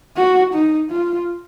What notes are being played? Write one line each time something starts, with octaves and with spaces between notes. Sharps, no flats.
F#4
D#4
F4